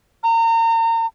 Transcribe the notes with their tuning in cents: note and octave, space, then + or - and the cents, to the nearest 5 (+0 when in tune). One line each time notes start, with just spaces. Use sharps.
A#5 -35